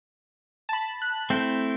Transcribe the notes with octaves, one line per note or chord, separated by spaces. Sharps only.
A5
B5
F#6
A3 C4 E4 G6